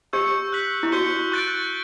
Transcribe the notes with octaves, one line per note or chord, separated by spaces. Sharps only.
G4 C#6 E6 G6 C#7
F#6 B6 F#7
E4
F#4 C#6 G6 C#7 G7
C#6 F#6 A6 D7